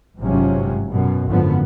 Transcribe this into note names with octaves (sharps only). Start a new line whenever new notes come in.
G#1 G2 C3 F3 F#3 C#4
F#2 B2
G#1 F#2 D3 F3 B3